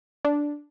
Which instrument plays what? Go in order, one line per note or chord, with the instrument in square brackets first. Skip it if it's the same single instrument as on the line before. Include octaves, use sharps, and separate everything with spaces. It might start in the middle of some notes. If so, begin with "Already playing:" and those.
[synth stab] D4